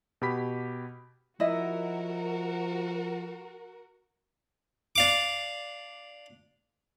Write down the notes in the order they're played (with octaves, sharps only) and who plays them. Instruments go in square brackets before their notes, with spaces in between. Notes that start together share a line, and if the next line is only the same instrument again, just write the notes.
[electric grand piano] B2 G4 B5 B6
[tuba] F3 [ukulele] E4 D#5 [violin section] F#4 A#4
[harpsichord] D4 F5 D6